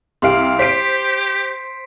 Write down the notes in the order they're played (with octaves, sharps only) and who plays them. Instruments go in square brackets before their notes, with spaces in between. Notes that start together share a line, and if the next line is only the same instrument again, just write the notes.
[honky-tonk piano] C2 G4 F5 [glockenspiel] C6 D7
[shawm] G4 [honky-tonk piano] C5 D7 [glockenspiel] B6 C7